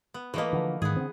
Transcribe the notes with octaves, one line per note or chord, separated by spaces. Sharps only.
B3
E3 A3 A#3 B4 D#5
D3 F3
G#2 D#3 B3 G#4
D3 C4